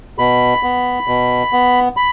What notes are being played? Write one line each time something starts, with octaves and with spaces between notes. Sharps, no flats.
B2 B5
B3
B2
B3
B5